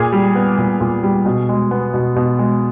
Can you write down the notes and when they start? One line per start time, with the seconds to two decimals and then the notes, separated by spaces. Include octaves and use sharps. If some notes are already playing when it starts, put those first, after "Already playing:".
Already playing: A#2 G#4
0.13 G3
0.35 B3
0.58 A#2
0.80 A#2
1.03 G3
1.26 B2
1.49 G#3
1.71 B3
1.94 B2
2.16 B2
2.39 G#3